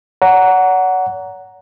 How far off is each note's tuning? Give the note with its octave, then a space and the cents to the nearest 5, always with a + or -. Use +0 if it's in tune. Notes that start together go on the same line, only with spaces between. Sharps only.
C#5 +45 F#5 +0 A#5 +0